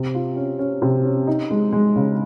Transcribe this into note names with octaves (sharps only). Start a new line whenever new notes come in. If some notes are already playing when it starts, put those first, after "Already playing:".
Already playing: C3
F4
C#4
C#4
C3
C#4
D#4
G#3
G#3
C#3